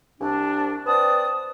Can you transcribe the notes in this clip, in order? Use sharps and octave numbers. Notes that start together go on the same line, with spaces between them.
C2 D4
C4 B4 D5 A5 D#6